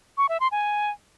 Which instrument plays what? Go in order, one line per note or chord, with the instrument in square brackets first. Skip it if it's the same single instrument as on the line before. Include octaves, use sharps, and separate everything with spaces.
[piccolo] C#6
E5
C6
G#5